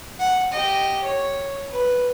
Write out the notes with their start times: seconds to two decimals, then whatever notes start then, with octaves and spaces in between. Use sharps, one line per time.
0.20 F#5
0.53 G4 D#5
1.03 C#5
1.71 B4